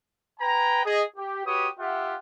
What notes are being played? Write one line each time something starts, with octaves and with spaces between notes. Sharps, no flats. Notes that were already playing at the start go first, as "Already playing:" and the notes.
B4 G5 G#5 A#5
G#4 D#5
G4
F#4 G4 B4 C#5 D#6
F4 G4 E5 F#5